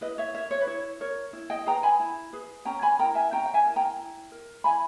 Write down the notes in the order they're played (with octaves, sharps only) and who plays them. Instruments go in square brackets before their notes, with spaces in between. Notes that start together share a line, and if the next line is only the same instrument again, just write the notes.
[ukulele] E4 B4 D#5
C#5 E5
A#4 C#5 E5
C#5
B4
E4 C#5
A#4 C#5
E4
D#5 G5
G#4 B4 G5 A#5
G#5 B5
E4
G#4 B4
C#4 G5 A#5
G#5 B5
E4 A#4 G5 A#5
E5 G#5
C#4 G5 A#5
G5
E5 G#5
E4 A#4
G5 A#5
E4
A#4
E4 G#5 B5